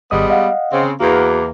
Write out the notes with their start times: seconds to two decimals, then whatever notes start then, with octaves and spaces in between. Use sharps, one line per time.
0.11 G#1 G3 G#3 B3 D#5 D#6
0.30 D#5 F5 F#5
0.72 C#3 C4
1.00 E2 A#3 F#4